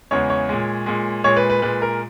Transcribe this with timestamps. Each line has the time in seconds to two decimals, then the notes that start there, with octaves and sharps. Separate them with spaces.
0.11 E2 C#3 E3 G#3 C#5
0.30 C#5
0.49 A#2 G#3
0.86 A#2 G#3
1.24 A#2 G#3 C#5
1.37 B4
1.50 B4
1.62 A#2 G#3 B4
1.82 A#4